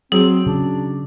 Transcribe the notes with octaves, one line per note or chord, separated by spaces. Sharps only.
F#3 C4 G#4
C#3 D4